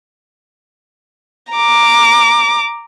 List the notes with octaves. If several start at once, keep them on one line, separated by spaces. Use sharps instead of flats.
A#5 D6